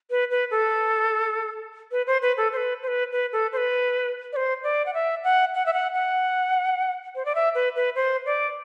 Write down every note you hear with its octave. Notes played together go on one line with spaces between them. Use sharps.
B4
B4
A4
B4
C5
B4
A4
C5
B4
C5
B4
B4
A4
C5
B4
D5
C5
D5
F#5
E5
F#5
F#5
E5
F#5
F#5
C5
D5
E5
B4
B4
C5
D5